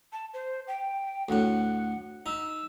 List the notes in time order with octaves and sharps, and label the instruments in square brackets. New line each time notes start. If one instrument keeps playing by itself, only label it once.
[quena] A5
C5
G5
[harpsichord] D2 A2 [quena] F#5
[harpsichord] D#4 [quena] E6